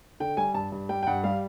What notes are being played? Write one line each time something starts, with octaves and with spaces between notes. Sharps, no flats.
D3 G5
G3 G#5
G2 A5
G2
G3 G5
G5
G2 F#5
G3 F5